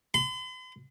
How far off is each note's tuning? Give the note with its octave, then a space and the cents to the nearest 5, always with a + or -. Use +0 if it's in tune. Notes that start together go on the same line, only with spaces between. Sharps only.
C6 -45